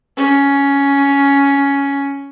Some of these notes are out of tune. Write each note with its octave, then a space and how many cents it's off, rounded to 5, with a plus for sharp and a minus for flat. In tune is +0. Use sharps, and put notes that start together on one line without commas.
C#4 +10